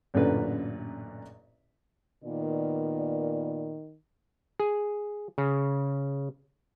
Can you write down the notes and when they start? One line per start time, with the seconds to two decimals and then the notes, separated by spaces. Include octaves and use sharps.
0.14 A1 F#2 A#2 D3 B4
2.24 A#2 D#3 B3 D5
4.59 G#4
5.38 C#3